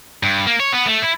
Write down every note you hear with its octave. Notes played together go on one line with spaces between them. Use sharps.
G2
A#3
C#5
B3
A3
E4